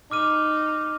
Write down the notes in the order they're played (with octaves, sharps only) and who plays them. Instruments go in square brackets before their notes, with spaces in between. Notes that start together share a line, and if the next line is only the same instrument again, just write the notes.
[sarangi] D#4 [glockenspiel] D6 F6 D#7